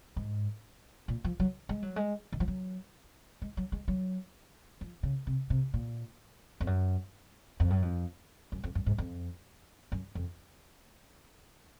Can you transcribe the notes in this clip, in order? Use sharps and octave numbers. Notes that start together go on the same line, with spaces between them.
G#2
A#2
F3
F#3
G#3
F#3
G#3
D#3
F3
F#3
G#3
F#3
G#3
F#3
F3
C#3
C3
C3
A#2
F2
F#2
F2
F#2
F2
F#2
F2
F#2
G#2
F2
F#2
F2